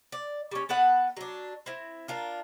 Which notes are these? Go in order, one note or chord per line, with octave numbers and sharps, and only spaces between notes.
D5
G3 C#4
B3 A4 B4 F#5
F#3 D4
C4 E4
D4 F4 A#4